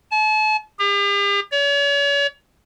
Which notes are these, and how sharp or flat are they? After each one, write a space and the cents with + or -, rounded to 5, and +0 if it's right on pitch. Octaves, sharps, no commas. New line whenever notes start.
A5 -40
G4 +45
C#5 +40